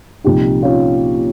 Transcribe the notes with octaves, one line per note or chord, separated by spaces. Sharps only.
C2 A#2 F3 D#4 G4
C#4 F4